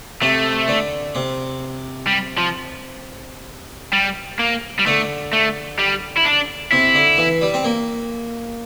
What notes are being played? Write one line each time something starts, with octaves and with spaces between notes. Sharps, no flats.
C3 A3
D3
C3
G3
F3
G3
A#3
G3
D3 A3
A3
G3
E4
D4
C3 E4
D3
E3
G3
C4
A#3